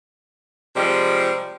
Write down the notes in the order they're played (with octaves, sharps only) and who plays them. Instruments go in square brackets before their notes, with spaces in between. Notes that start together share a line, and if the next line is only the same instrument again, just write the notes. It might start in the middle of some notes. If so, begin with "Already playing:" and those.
[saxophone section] C3 F3 G3 G#3